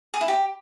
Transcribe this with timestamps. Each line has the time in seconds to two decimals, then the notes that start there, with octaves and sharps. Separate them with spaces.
0.14 G#4
0.21 E4
0.28 G4